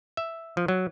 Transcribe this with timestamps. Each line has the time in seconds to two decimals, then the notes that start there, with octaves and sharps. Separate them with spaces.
0.17 E5
0.57 F3
0.68 F#3